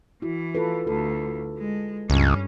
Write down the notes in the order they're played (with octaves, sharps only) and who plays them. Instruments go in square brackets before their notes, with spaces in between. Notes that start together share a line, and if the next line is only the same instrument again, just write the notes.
[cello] E3 [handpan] E4 F#4
[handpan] F4 A4 B4
[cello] D2 [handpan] A4
[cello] G#3
[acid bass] C#2 [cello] G2 C#4